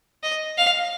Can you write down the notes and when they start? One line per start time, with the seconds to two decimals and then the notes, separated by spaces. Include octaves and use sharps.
0.23 D#5
0.58 F5